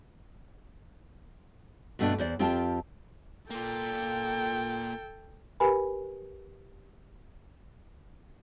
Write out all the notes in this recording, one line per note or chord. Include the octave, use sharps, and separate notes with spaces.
G2 B2 A3 B3 D4
E2 C5 D5
F2 C4 F4 G4 A5
A#3 F4 A4 G5
G4 A#4 B4 G#5 B5